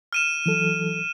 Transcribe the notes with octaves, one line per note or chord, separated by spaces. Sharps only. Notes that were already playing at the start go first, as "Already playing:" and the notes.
F6 D#7 E7
E3 F#3 A4